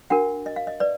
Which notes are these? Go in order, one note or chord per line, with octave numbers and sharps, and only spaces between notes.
D4 F#4 A#4 F#5
D#5
F5
D#5
B4 D5